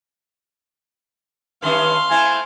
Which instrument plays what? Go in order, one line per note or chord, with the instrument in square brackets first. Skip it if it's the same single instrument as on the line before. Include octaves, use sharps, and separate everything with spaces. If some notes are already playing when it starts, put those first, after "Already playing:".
[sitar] G2 D#3 C#4 [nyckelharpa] F5 C6
[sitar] A3 C4 E4 [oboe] G#5